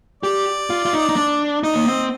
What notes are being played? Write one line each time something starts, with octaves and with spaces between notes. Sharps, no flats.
G4 D5
F4
F4
D#4
D#4
D4
D#4 D#5
A#3
C4